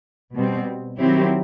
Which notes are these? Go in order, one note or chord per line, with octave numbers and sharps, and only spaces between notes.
B2 G3 C4
D#3 F#3 C4 E4 G4